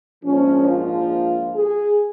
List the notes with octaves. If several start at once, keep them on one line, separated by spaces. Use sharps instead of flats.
A#1 G#2 F3 C#4
F4
G#4